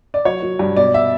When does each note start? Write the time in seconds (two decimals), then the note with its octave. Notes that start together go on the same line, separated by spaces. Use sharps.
0.14 D5
0.25 F#3 C#5
0.42 F#3
0.59 G2
0.77 B2 D5
0.94 E5